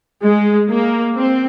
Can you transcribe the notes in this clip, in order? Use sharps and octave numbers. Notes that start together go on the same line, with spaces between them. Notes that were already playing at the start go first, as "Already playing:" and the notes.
G#3
A#3
C4